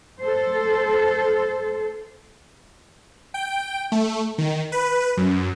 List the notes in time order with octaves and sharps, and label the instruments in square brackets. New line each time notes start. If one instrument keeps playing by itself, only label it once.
[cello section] A4 C5
[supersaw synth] G5
A3
D#3
B4
F#2